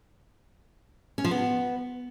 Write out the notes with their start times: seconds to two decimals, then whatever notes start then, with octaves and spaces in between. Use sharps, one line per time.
1.18 C#4
1.24 F3
1.31 B3